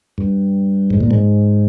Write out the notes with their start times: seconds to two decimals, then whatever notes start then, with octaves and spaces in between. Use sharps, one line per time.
0.18 G2
0.91 G#2
1.01 A#2
1.11 G#2